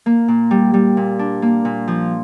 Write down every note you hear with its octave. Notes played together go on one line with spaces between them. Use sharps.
A#3
A#2
G3
G3
A#2
D4
A#3
A#2
F3